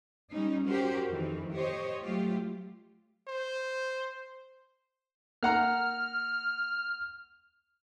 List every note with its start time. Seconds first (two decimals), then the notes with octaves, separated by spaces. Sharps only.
0.31 G3 C#4 D#4
0.66 C#4 F#4 G4 A#4 C5
1.07 F2 D#3 E3
1.54 G4 C5 C#5 D#5
2.01 F#3 A3 F4 G4
3.27 C5
5.43 A#3 F#5 A#5 F6